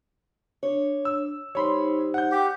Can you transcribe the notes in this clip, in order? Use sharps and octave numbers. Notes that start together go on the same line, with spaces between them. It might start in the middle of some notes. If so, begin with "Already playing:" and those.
D4 C#5
E6
G3 D#4 C5 C#5 B5 C6
F#5 G6
G4